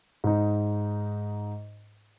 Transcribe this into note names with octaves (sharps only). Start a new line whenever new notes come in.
G#2 D#4